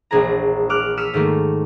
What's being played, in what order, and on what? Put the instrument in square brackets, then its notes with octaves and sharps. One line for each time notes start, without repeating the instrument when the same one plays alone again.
[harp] E1 A#1 G#4 A#5
D6 F6 F#6
E6 F6 B6 C#7 D#7
G#2 D#3 A3 A#3